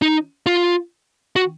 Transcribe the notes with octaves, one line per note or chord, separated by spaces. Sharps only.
D#4
F4
F#4